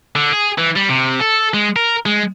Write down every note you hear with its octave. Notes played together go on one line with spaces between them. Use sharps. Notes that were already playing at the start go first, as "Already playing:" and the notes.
D3
G#4
E3
G3
C3
A4
G#3
A#4
G#3